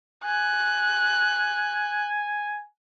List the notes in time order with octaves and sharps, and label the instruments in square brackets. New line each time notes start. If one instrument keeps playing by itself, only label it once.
[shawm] G#5 [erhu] F#6